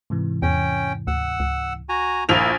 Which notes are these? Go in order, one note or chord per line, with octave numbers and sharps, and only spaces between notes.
G#2 C3 E3
E2 C#4 G5
D2 F#5 E6
C#2
F#4 G#5 A#5
A#1 A#3 E4 F7